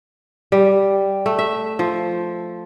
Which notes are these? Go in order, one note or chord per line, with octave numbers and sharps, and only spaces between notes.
G3
A3
E5
F3